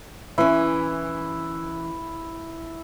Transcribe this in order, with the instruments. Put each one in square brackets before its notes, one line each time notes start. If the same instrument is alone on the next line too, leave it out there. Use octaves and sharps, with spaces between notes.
[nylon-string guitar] E3 C#4 [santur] E4